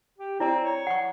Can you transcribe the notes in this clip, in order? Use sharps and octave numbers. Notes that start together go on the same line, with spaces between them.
G4
C4 E4 D5 A#5
C#5
F#5 C#6